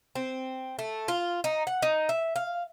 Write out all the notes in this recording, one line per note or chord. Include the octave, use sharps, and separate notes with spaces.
C4
A3
F4
D#4
F#5
D#4
E5
F5